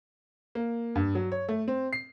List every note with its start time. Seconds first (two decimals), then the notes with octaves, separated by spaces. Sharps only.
0.55 A#3
0.95 G2
1.15 F#3
1.32 C#5
1.49 A3
1.68 C4
1.93 C7